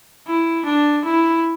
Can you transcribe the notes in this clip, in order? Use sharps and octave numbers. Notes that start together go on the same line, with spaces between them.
E4
D4
E4